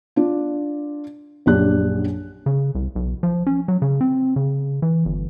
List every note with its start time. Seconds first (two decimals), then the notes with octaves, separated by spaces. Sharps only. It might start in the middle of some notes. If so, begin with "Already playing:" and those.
0.16 D4 F4
1.46 A#1 F#2 D4 G4 F#6
2.46 C#3
2.75 C2
2.95 B1
3.23 F3
3.47 C#4
3.68 F#3
3.82 C#3
4.01 C4
4.36 C#3
4.82 E3
5.05 G1